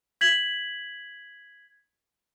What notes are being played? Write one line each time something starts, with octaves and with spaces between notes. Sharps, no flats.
G#6 B6 F#7